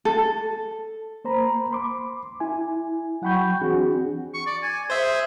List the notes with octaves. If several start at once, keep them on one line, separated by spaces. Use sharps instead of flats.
A4
A#3 C5 A#5 B5
B5 C6 D6
E4 G#5
F#3 F#5 G5 B5 C#6 G6
E3 C4 D4 F#4 G#4
C#6
D5
G#5
G#4 C5 E5